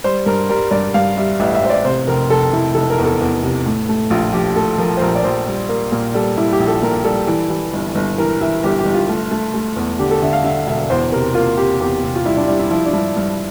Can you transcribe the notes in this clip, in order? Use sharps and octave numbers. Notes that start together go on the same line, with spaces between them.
G3 C5
G2 A#4
G3 A#4
G2 D5
G2 F5
G3 E5
A1 E5
E5
A1 C5
D5
C3 C5
F1 A#4
F1 A4
F1 E4
F1 A4
A#4
E2
A4
E2
C3
A2
A3
A#1 F4
F3 G4
A3 A4
F3 A#4
C5
A#1 A#4
D5
A#1 C5
G3
A#3
A#2 A#4
G3 A4
G3 E4
G4
A#1
A4
A#2 A#4
G3 A4
E3
E3
G1
G1
E3 A#4
E3 E5
G1 G4
G4
G1
F4
A3
A3
A3
E2
D3 G4
A4
D3 E5
F5
D3 E5
E1 E5
E2 C5
C3 A#4
A#3 F4
C3 G4
E2 G4
C3
F4
G3 E4
D4
G3 E4
E4
F3 E4
D4
G2 E4
G2